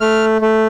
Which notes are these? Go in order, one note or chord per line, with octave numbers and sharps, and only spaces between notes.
A3 F6
A3